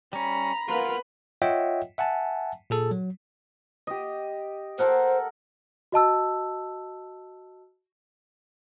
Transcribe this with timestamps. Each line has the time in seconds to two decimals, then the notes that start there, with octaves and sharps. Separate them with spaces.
0.13 G3 C#4 A#5 B5
0.68 A#3 B3 F4 A#4 B4
1.42 F4 C#5 D#5 E5 F#5 G5
1.98 E5 F#5 G#5 A5
2.70 A#2 G#4 A4
2.91 F#3
3.87 G4 D#5
4.79 A4 A#4 C5 F#5
5.92 F#4 D#5 A5 E6